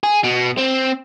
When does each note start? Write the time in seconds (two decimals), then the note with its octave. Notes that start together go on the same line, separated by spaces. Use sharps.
0.04 G#4
0.24 B2
0.57 C4